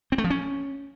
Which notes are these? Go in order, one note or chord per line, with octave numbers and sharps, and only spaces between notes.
C4
A3
F3
C#4